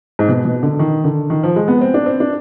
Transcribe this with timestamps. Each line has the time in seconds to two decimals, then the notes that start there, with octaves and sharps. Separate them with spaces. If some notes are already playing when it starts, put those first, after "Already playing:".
0.19 G#2
0.29 B2
0.45 B2
0.63 D3
0.79 D#3
1.04 D3
1.30 D#3
1.43 F3
1.56 G#3
1.68 B3
1.81 C4
1.94 D4
2.06 C4
2.20 D4